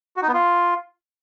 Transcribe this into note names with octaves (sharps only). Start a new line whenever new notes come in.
F#4
D#4
B3
F4